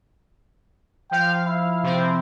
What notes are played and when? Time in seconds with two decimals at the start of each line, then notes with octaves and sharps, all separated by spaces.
1.11 F3 F5 G5
1.46 E4
1.83 C3 F3 C4